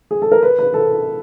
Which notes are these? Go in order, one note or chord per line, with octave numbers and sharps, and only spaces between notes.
G#4
A4
A#4
B4
B4
A4